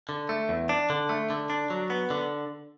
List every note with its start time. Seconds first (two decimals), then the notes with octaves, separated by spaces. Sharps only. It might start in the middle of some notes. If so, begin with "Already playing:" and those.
0.09 D3
0.29 A3
0.49 E2
0.69 D4
0.90 D3
1.09 A3
1.30 D3
1.50 D4
1.70 F#3
1.90 B3
2.10 D3